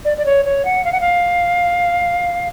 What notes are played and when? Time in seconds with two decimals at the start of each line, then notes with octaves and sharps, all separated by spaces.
0.05 D5
0.17 D5
0.25 C#5
0.45 C#5
0.65 F#5
0.85 F5
0.92 F#5
1.01 F5